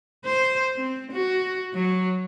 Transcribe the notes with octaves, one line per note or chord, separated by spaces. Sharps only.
C5
C4
F#4
F#3